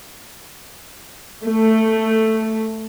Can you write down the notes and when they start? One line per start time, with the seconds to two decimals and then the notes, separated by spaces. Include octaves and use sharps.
1.45 A3